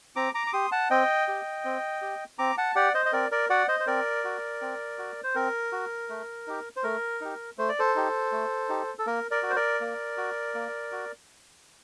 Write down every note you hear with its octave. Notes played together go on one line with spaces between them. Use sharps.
C4 A#5 D6
A#5 D6
D6
G4 C6 D#6
F#5 A5
C4 D#5 G5
G4
C4
G4
C4 A#5 D6
F#5 A5
G4 D5 F#5
C5 D#5
D#5
C4 A#4 D5
A#4 D5
F#4 D5 F#5
C5 D#5
C5
C4 A#4 D5
F#4
C4
F#4
C5
C4 A#4
F#4
A3
D#4 G4
C5
A3 A#4
D#4 G4
A3 C5
D5
A4 C5
D#4 G4
A3
D#4 G4
A4
A#3 A#4
A#4 D5
F#4
C5
A#4 D5
A#3
F#4
A#3
F#4